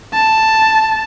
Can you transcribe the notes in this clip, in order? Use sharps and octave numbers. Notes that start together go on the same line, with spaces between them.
A5